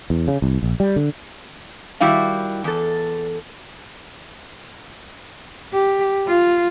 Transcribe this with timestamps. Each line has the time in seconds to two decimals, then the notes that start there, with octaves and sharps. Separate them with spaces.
0.10 E2
0.28 C#3
0.42 C2
0.63 A#1
0.80 G3
0.96 D3
2.00 D#3 G3 E4 F#4 F5
2.64 E2 A4
5.73 G4
6.27 F4